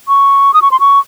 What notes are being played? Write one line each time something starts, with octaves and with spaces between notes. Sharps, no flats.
C#6
D#6
C#6
C6
C#6